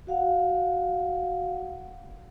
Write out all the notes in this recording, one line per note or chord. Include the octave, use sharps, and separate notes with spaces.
F#4 F5 F#5